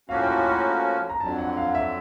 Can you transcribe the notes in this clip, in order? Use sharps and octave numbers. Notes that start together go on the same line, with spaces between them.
A2 F3 A#3 C#4 F#4 F5
G5
A5
B5
A#5
A#5
F2 D3 F#3 A5
F#5
F5
E5